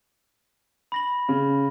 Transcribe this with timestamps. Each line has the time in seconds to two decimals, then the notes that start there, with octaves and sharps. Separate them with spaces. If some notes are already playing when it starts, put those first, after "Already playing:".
0.92 B5 A#6 F#7
1.28 C#3